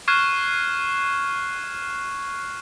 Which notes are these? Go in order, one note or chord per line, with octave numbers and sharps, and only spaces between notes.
C#6 F6 F#6 G#6 C7 E7